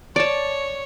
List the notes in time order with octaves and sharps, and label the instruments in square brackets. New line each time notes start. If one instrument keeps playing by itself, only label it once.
[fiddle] C#5 [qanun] D5 A5